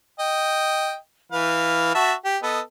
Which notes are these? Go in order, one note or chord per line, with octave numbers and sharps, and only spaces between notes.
D#5 G5
E3 B4 F5
F#4 E5 A5
G4
B3 A4 D#5